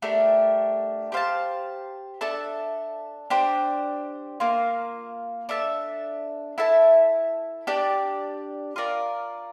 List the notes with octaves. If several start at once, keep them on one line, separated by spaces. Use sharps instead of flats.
A3 D4 G4 A#4
G4 C5 F5 A5
D4 A4 E5 A5
D4 G4 C5
A#3 F4 A#4
D4 A4 E5 A5
E4 A4 E5 A5
D4 G4 D5 A5
F4 A#4 D5